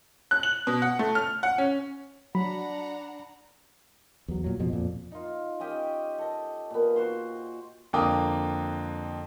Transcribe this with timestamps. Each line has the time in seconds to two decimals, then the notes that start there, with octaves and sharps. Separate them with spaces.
0.31 F#6
0.43 F#7
0.67 B2
0.82 F#5
0.99 A3
1.15 F6
1.43 F#5
1.58 C#4
2.35 F#3 D4 F#5 A#5 B5
4.28 E2 F#3
4.44 A#2 F#3
4.59 F2 B2 F3
4.73 F2 A#2
5.12 D#4 F4
5.60 C#4 G4 D#5 G5
6.18 A4 D#5
6.70 A#2 B3
6.96 F#4 C5 C6
7.93 F2 D3 A#3 G5 D6 D#6